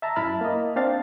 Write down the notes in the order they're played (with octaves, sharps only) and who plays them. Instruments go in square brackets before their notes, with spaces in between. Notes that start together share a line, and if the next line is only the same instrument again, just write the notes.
[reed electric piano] E5 A5 A#5
F#2 E4 A5 B5 F6
A#3 D#5
C4 D4 F5 A6